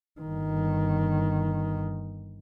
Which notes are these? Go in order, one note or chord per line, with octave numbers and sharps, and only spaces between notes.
G1 D#3